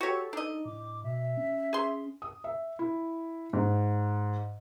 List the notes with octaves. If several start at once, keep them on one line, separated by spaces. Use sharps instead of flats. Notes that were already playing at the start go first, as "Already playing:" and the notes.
F#4 G4 A4 C#5
D4 D#4 D#5
A2 D6
B2 E5
C#4
G#4 C6
D#6
E5
E4
G#2